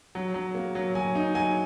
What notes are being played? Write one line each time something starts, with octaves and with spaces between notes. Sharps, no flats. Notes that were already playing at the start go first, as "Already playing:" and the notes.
F#3
F#3
A#3
F#3
F#3 G#5
D#4
F#3 G#5